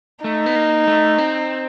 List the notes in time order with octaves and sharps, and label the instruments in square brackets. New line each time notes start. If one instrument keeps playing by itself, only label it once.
[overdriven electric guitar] A3 [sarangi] D#4
[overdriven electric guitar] B3
A#3
A3
C4